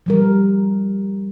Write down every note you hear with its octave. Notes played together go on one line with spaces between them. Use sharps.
F3 G3 A#4